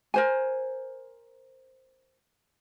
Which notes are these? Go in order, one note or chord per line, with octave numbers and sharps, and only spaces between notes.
A#4 C5 G#5